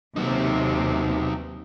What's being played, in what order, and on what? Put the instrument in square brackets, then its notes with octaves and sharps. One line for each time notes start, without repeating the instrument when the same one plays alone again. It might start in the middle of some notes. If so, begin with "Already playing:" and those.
[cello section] D#2 C3 [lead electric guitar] F#3 D#4